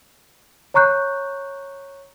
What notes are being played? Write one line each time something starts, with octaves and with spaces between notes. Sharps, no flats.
C#5 A#5 C#6 F#6 G6